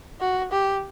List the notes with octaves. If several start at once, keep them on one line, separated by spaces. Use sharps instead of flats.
F#4
G4